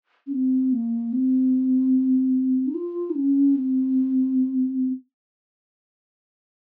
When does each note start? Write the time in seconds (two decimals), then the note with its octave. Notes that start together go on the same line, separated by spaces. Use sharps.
0.27 C#4
0.32 C4
0.72 A#3
1.12 C4
2.67 D#4
2.74 F4
3.10 D#4
3.15 C#4
3.55 C4